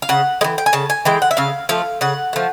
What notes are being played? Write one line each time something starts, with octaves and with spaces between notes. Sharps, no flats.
F5
C#3 F#5
E3 G#3 G5
G5
G#5
C#3 A5
G#5
E3 G#3 G5
F#5
E5
C#3 F5
F3 A3 F5
C#3 F#5
F3 A3